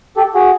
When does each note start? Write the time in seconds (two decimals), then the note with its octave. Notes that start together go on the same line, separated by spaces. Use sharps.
0.17 G4 A4
0.35 F#4 G#4